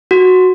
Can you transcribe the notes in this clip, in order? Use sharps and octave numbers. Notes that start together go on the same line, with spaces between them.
F#4